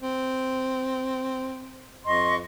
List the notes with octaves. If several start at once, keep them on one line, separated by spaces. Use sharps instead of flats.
C4
F2 D#5 C6 C#6